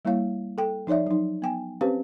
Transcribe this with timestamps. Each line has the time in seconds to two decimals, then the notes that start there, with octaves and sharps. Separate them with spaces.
0.05 G3 A#3 E4 C#5 F5
0.58 A4 G5
0.87 F3 D#4 C#5 D5 E5
1.07 F#3 D#4
1.42 B3 G5 G#5
1.81 C4 C#4 G4 B4 C5 F5